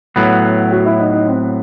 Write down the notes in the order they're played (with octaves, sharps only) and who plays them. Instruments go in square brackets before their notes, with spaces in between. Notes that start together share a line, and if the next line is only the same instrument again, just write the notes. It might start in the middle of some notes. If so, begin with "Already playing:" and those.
[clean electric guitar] A2 F#3 B3
[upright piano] F#4
E4
D#4
D#4
C4